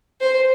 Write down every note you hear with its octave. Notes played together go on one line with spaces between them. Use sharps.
C5